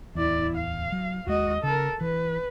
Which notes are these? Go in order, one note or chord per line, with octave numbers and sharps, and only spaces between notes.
D1 E2 E4 D5
F5
F#3
D#2 G#3 F#4 D#5
C#3 A4 A#4
E3 B4